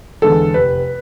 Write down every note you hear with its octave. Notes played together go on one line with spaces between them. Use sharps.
E2 D3 G#3 A4
F1 B4